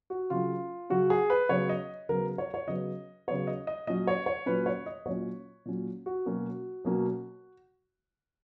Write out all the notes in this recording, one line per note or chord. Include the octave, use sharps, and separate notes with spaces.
F#4
C#3 F#3 C#4 F4
C#3 F#3 C#4 F#4
G#4
B4
C#3 F#3 B3 C#5
D#5
C#3 F#3 B3 A#4
C#5
C#5
C#3 F#3 B3 D#5
C#3 F#3 B3 C#5
D#5
D#5
A#2 F#3 C#4 D#5
C#5
C#5
A#2 F#3 C#4 B4
C#5
D#5
A#2 F#3 C#4 C#5
A#2 F#3 C#4
F#4
B2 F#3 A#3 C#4
B2 F#3 A#3 C#4